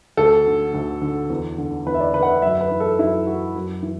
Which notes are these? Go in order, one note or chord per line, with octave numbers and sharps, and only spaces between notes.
D2 A4
D3
D2
D3
E2
D3
E2 B4
E5
D5
D3 B4
F#5
E5
F#2 E5
B4
E3
A4
F#2 E4
E3 F#4
F#2
E3